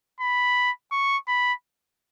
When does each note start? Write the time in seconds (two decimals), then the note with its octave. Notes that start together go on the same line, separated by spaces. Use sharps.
0.20 B5
0.92 C#6
1.28 B5